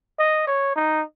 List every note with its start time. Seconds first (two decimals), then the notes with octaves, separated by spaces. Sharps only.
0.19 D#5
0.47 C#5
0.76 D#4